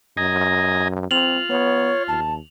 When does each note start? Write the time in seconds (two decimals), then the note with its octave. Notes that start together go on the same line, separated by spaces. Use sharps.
0.17 F#2 D#5 G#5 A#5
1.11 C4 F4 F7 F#7
1.50 B3 C#5
2.08 D#2 A5